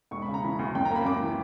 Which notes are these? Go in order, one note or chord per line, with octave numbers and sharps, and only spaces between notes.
E1 C#6
B5
C#3
A#5
E3 B5
D2
F#2 G5
A#5
A#3 B5
F#2 D6
E3